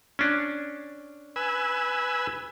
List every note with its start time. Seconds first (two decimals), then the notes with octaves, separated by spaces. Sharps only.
0.19 C#4 D4
1.36 B4 G#5 E6